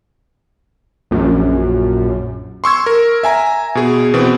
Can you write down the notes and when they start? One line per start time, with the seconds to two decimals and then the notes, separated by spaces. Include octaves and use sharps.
1.11 A#1 F#2
2.64 C6 C#6 E6 G#6
2.86 A#4
3.23 E5 G#5 A#5
3.75 B2 G#4
4.14 B2 E3 C4